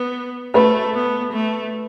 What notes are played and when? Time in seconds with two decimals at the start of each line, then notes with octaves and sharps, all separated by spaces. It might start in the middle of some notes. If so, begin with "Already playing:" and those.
Already playing: B3
0.54 A3 B4
0.94 B3
1.33 A3